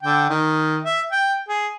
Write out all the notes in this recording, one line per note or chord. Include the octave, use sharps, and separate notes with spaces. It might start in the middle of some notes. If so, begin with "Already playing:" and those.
D3 G5
D#3
E5
G5
G#4